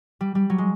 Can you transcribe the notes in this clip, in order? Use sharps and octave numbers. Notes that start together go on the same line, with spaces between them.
G3
G3
F#3
G#3